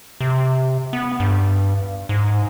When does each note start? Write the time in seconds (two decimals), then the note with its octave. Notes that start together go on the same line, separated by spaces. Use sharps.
0.21 C3
0.93 B3
1.20 G2
2.09 G#2